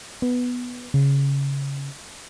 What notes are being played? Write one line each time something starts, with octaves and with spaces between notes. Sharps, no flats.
B3
C#3